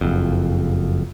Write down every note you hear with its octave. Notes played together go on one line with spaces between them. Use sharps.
F#1 F2